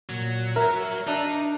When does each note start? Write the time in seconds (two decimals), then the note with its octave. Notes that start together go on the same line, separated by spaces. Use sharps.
0.09 A#2 F#3
0.56 A#4 E5
1.07 D4 D#4 E5